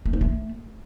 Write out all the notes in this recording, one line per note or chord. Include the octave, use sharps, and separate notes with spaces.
A3
D#4
A3